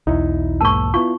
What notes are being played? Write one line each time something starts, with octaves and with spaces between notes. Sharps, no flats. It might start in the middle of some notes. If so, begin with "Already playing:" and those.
B1 E2 D#4 E4
G#2 A#3 A5 C#6 E6
B3 E4 F4 C#6